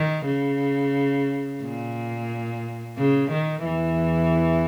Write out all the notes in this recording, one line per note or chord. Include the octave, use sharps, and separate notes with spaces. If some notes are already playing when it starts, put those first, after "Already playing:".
Already playing: D#3
C#3
A#2
C#3
D#3
E2 E3